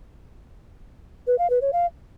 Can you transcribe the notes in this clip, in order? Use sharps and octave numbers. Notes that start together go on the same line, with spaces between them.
B4
F5
B4
C#5
F5